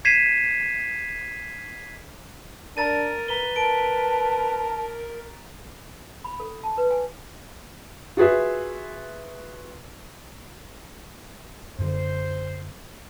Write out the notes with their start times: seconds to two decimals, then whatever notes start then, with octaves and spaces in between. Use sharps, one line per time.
0.05 G#6 B6 C7 D#7 E7
2.77 D4 A#4 A#5 A6 D#7
3.28 B4 A#5 B6 G7
3.56 A#4 A5 D7
6.24 B5
6.40 A4
6.64 A5
6.78 B4
6.91 G#5
8.17 F4 F#4 G#4 B4 E5
11.79 F#2 D3 C5